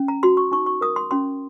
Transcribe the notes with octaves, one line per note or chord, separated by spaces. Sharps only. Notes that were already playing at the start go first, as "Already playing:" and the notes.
Already playing: C#4
A#5
F#4 C6
C#6
D#4 C#6
C#6
A#4 D#6
C6
C#4 C6